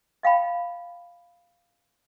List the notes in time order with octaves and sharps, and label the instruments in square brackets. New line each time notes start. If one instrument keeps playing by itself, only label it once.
[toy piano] D#5 F5 G5 B5